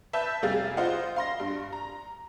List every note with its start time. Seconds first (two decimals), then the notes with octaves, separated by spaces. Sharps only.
0.13 B4 E5 A5 E6 G6
0.42 F1 G3 G#4 F5 A6
0.77 F4 C5 D#5 F5 F#5
1.16 F5 C6 A#6
1.40 G2
1.73 A#5